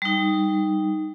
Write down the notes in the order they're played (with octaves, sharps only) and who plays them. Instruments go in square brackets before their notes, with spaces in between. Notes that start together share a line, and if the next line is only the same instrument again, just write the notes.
[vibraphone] G3 D#4